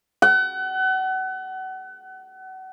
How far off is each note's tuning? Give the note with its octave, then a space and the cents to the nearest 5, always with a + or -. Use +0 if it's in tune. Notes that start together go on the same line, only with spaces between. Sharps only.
F#5 +30